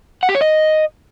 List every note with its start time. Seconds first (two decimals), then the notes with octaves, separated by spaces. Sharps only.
0.23 F#5
0.29 G4
0.35 C#5
0.41 D#5